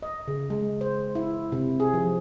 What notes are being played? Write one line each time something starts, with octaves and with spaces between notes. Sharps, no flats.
D#5
C#3
G#3
C5
E4
C3
G#4
F3